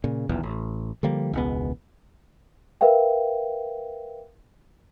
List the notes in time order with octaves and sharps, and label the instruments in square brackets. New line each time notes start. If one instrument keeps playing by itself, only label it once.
[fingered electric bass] A#2 C#3
D#1 B1 E2
A1
D3 F3 G3 A#3
E1 C#2 G#3 B3
[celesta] A#4 B4 E5 F5 G5